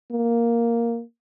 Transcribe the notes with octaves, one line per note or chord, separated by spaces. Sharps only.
A#3